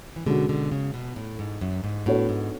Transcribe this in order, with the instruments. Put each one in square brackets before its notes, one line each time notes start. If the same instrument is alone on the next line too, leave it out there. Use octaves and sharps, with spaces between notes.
[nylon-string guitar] E3
[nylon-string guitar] B2 D3 [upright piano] G#3 C#4 F#4
[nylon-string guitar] B2 D3
C#3
B2
A2
G#2
F#2
G#2
[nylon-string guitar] A2 [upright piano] B3 D4 F#4 A4 C#5
[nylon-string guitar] G#2